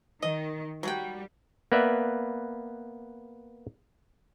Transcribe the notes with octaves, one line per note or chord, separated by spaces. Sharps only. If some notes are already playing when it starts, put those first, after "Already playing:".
D#3 D#5
F#3 G3 F#5 G5
A#3 B3 B4 D5 E5